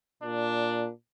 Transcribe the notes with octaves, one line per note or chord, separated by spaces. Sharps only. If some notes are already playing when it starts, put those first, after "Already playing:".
A#2 D4